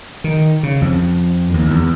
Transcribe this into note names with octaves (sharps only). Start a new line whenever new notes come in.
D#3
C#3
F2
D#2
E2